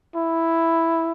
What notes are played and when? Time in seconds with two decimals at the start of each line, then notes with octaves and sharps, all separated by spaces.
0.15 E4